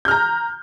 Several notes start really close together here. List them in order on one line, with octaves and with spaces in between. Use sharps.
G6 F6 A#5